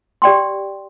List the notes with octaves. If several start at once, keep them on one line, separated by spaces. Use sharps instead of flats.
G4 D5 G5 C6